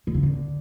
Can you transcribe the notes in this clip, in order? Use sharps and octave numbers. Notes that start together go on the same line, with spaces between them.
B2
C#3
D3